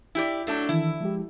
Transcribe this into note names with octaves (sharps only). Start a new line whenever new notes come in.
E4 G4 D5
F#3 A3 D4
D#3 E3 E4
F3 G#3 G4